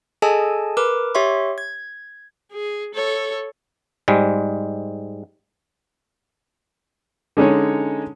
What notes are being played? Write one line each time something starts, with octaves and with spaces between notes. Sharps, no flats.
G#4 A4 D#5 G#5 A5
A#4 B4 D6
G4 C#5 E5 C6 C#6
G#6
G#4
A4 C#5
G#2 G3 G#3
D3 G#3 C#4 D#4 C#5